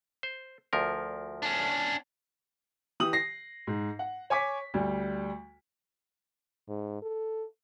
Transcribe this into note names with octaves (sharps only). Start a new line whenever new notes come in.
C5
D2 F3 A#4
C#4 D4
E3 G4 D#6 F#7
A#6 C7
G#2
F#5
C#5 G#5 C#6 D6 B6
D2 G3
G#2
A4